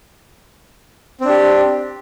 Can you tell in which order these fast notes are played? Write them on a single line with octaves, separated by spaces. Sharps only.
C4 D4 G4